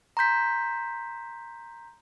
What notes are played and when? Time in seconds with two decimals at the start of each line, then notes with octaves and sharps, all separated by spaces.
0.17 A#5 C6 G6 B6